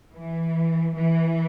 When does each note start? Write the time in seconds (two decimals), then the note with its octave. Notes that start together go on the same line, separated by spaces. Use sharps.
0.14 E3
0.95 E3